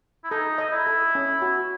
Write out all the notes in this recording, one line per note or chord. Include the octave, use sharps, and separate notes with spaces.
E4
D#4 A4
D#5
E4
A4
C#4
F#4